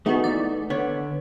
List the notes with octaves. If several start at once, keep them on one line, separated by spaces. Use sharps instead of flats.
A3 B3 D#4 F#4 G#4
E3 D5
D3 B3 C#5